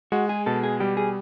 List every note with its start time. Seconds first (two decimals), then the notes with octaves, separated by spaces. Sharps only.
0.12 G#3 F#4
0.29 G#4
0.46 B2 A4
0.63 G#4
0.80 G3 G4
0.97 G#4